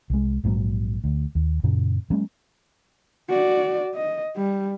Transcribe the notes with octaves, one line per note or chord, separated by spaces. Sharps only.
C2 G#3
A#1 G#2 F#3 A#3
D2
D#2
F#2 A#2 C#3
F#3 G#3 A#3 C#4
F#4 D5
D#5
G3